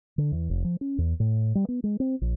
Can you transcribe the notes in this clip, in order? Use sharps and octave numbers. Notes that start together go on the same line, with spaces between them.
D3
E2
F1
F3
C#4
E2
A2
G3
B3
G#3
C4
A#1